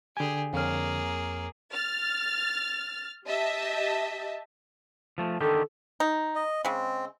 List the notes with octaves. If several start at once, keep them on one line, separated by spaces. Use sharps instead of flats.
D3 G4 G#4 G#5
F2 A#3 G#4 C#5 F6
F6 A6
G4 D#5 E5 A5
F3 A3
D3 D#3 G4 A4
D#4
D#5
C#3 G#3 C4